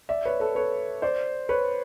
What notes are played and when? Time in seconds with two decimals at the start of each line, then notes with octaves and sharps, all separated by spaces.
0.09 D5 E5
0.25 B4 C#5
0.40 A4 B4
0.55 B4 C#5
1.02 C5 D5
1.49 B4 C#5